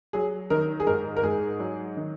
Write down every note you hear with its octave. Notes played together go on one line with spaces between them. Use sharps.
F#3 G#4
D#3 A#4
G#4
G#2 A#4
A#4
G#2 G#4
F#3
D#3